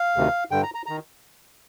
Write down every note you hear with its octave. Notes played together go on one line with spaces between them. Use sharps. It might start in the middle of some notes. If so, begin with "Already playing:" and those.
Already playing: F5
D2 C3 D#3
G2 D3 G5
A#5
A#5
D#3 A#5